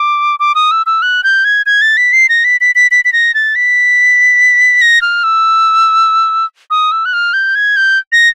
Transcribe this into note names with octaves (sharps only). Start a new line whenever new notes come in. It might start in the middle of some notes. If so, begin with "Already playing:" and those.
Already playing: D6
D6
D#6
E6
E6
F#6
G6
G#6
G#6
A6
B6
C7
A#6
B6
B6
B6
B6
B6
A#6
A6
B6
A#6
F6
E6
D#6
E6
F#6
F6
G6
G#6
G6
A#6